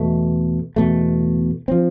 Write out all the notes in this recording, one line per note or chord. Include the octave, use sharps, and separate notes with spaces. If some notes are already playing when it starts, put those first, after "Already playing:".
Already playing: E2 B2 A3
E2 B2 A3
F3 C4